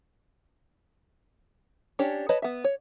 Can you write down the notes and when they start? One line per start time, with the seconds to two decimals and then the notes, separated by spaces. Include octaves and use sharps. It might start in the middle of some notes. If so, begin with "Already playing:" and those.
1.99 C#4 D4 G4 C#5
2.29 B4 C#5 D#5 A5 B5
2.42 B3 E5
2.64 C#5